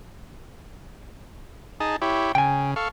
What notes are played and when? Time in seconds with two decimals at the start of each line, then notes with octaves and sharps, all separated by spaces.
1.80 D#4 G#4 A5
2.02 E4 G4 C#5
2.35 C#3 G5 G#5
2.76 A4 F5 C#6